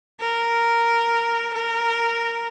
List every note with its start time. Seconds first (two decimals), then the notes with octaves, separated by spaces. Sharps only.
0.20 A#4
1.54 A#4